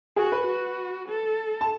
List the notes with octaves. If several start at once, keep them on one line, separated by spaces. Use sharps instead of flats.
F#4 G#4
B4
F#4
A4
A5